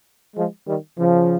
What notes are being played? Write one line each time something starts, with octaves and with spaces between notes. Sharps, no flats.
F3 G#3
D#3 G3
C#3 F3